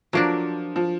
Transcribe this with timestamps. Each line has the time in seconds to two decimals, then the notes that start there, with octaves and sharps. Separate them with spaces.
0.13 F3 F#3 A#3 D4
0.76 F3